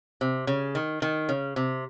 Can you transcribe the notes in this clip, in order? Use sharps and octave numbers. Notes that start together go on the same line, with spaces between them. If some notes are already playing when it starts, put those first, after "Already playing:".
C3
C#3
D#3
D#3
C#3
C3